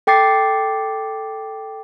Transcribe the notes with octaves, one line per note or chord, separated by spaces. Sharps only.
A4 G5 D6 A6 C7